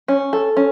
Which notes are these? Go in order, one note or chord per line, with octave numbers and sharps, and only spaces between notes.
C#4
A4
C#4